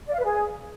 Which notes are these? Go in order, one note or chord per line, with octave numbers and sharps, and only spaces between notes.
D5
F5
B4
G#4